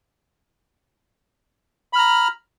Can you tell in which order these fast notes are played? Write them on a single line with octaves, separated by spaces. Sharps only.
B5 F6 A#5